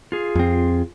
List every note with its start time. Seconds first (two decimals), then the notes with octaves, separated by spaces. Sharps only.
0.12 F4 G#4
0.35 F2 C4